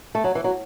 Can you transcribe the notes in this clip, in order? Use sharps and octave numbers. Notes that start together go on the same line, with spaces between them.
A3
F#3
E3
F#3